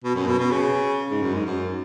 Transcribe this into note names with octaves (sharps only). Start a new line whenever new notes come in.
B2
F#2
B2
B2
C#3
G#2
F#2
G#2
F#2